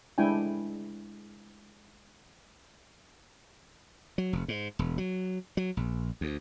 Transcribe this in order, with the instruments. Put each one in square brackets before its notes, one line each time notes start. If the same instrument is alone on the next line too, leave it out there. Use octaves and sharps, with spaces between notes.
[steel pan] G#3 D4 E4 G5 G#5
[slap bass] F#3
F1
G#2
E1
F#3
F#3
A#1
D2